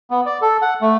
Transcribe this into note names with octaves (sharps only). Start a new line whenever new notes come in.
B3
D5
A4
F#5
A3